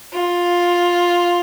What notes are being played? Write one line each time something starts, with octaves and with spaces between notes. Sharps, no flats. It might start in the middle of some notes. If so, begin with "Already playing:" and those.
F4